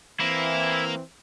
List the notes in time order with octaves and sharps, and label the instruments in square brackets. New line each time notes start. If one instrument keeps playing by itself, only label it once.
[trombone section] E3 C4 [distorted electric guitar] A#3 [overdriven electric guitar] E4